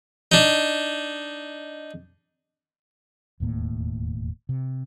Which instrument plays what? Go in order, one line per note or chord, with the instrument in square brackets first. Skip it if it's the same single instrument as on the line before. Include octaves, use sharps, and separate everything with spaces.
[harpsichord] D4 D#4
[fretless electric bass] E1 D#2 A2 A#3
C3